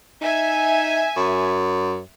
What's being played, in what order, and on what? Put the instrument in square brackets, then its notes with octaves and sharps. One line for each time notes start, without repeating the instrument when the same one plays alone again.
[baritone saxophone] D#4 [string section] E5 G#5
[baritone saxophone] F#2